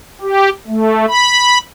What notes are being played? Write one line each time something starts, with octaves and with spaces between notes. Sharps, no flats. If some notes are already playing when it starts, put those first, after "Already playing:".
G4
A3
B5